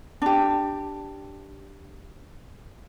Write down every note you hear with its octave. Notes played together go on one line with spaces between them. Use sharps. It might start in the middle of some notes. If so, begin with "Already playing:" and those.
D4 G4